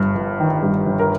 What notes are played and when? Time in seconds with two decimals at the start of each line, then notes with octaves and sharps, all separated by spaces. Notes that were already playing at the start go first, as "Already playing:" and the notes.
Already playing: G1 G2
0.15 G1
0.40 D#3
0.63 G2
0.87 G1
0.99 A#4